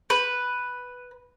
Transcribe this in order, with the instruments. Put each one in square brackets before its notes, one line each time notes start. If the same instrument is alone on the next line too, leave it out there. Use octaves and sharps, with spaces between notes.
[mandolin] B4